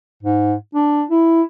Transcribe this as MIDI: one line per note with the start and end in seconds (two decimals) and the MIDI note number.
0.23 0.54 44
0.74 1.03 62
1.10 1.42 64